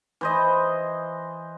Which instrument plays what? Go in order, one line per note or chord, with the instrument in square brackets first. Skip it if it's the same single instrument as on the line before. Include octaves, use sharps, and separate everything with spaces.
[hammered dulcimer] E3 C5 D#5